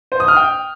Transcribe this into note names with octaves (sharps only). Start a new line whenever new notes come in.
C5
D#6
F6
G5